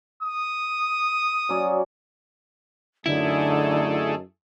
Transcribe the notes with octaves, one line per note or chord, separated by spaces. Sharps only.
D#6
F#3 C#4 D5
F#2 D3 A3 D#4 E4 G#4 A4